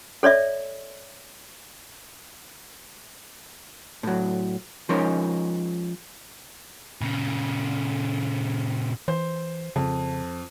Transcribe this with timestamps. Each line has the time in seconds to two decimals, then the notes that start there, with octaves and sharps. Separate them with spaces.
0.23 A4 C#5 D5 E5
4.03 A2 F#3
4.89 F3 G#3 C#4 D#4 A#4
7.01 A#2 C#3
9.08 E3 C5
9.76 F2 C#3